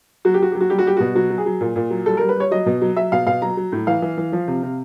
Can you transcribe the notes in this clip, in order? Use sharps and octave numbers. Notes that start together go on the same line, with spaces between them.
F#3 F#4
G4
F#3 F#4
F#3 G4
F#4
G3 G4
F#4
G3 G4
B2 F#4
F#3 F#4
F#3
G#4
F#3
A#2
A#2
F#3
G3 A4
G3 A#4
B4
G3 C#5
F#3 D#5
B2
F#3
F#3 E5
B2 F5
B2 F5
F#3 A#5
F#3
A2
E3 F5
E3
E3
F3
C3
C3